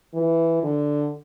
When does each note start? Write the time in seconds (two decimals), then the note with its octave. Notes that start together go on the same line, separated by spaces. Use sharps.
0.14 E3
0.63 D3